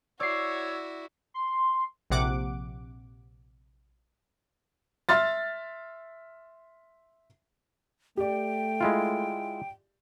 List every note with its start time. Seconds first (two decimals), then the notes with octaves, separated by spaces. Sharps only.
0.20 E4 F#4 C#5 D5 E6 C7
1.34 C6
2.10 A#1 C3 F#5 D6 D7
5.09 E5 C6 F6 A6
8.17 A3 G4 D5 G5
8.81 G#3 E4 F4